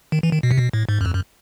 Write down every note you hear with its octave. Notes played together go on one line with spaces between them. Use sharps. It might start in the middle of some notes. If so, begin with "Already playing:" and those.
D#3
E3
D#3
B2
C3
B2
A2
G#2
F#2
F2
F#2